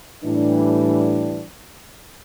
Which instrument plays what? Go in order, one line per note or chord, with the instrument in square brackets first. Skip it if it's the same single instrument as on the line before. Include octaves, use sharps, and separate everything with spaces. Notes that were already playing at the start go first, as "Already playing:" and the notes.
[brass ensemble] A2 E3 G3 D4